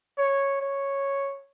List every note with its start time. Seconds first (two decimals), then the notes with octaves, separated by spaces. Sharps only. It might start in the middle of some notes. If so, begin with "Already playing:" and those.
0.18 C#5
0.61 C#5